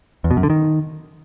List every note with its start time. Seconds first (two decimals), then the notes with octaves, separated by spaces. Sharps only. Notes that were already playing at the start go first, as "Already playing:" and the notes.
0.24 E2
0.31 B2
0.37 F#2
0.43 D3
0.50 D#3